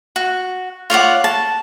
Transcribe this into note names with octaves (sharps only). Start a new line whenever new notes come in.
F#4
F4 C#5 D5 F#5
A5